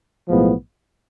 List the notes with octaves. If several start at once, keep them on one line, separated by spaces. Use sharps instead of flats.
B1 A2 F3 G#3 B3